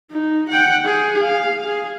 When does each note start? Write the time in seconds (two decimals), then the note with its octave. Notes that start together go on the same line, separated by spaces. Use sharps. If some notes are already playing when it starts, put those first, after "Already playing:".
0.11 D#4
0.49 F#5 G5
0.85 G#4
1.22 F5
1.65 G#4